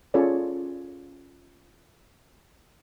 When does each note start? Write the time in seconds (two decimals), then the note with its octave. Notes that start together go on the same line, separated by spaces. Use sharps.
0.14 C#4 F4 G#4 A4 C#5 D5